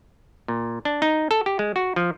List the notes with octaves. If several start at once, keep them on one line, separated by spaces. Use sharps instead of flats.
A#2
D4
D#4
A4
G4
G#3
F#4
F3